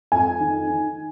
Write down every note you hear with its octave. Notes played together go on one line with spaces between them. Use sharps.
F2 G#5
D#3
D#3